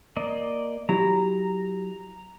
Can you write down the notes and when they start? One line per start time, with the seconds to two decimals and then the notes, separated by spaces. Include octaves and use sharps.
0.17 A#3 D5 D#5
0.89 F#3 E4 G4 A#5